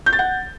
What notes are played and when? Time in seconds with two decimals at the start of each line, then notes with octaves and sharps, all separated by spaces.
0.06 G6
0.13 A6
0.19 F#5